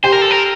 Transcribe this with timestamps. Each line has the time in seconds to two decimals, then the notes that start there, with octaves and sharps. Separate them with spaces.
0.04 G4 C5
0.12 A#4
0.22 A4
0.31 A#4